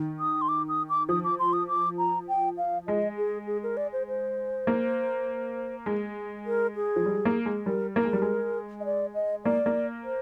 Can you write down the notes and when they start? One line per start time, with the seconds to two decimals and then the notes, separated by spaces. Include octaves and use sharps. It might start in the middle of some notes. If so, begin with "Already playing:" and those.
Already playing: D#3
0.20 D#6
0.42 C6
0.49 D6
0.69 D#6
0.89 D6
1.09 F3 D#6
1.24 D6
1.39 C6
1.53 D#6
1.68 D6
1.98 A#5
2.28 G5
2.58 F5
2.88 G#3 D#5
3.17 G#4
3.47 G#4
3.63 A#4
3.77 D5
3.93 C5
4.08 C5
4.67 A#3
5.86 G#3
6.46 A#4
6.76 G#4
6.96 F3
7.06 G3
7.25 A#3
7.46 G#3
7.66 G3 A#4
7.96 A#3 A#4
8.04 G#3
8.13 G3
8.22 G#3
8.80 D#5
8.85 D5
9.14 D#5
9.44 A#3 D5
9.66 A#3
10.04 C5